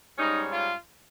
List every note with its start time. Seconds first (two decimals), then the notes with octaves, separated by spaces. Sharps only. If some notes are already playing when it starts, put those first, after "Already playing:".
0.17 G#2 G3 C#4 D#4
0.51 F4